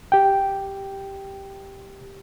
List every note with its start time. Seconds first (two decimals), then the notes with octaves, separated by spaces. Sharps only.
0.12 G4 G5